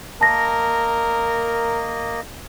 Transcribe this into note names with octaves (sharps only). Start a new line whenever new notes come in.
A#3 A#4 D#5 A5 A#6